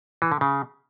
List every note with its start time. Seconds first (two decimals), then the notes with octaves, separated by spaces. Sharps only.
0.22 E3
0.32 D3
0.41 C#3